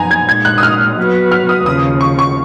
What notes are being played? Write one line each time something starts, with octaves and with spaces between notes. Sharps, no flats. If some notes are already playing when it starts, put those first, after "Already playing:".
Already playing: F#2 F3 B3 D#4 G#5 A#5
G#6
A#2 G#3 D#4 G#6
F#6
D#6
F6
F#3 B3 F#4 B4
F6
D#6
D#2 C#3 F3 D#6
C#6
C#6